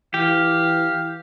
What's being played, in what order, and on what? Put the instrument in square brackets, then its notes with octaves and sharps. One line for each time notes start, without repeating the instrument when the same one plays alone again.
[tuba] E3 [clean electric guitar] G4 [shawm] F5